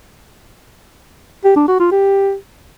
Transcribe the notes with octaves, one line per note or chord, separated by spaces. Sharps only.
G4
D4
F#4
F4
G4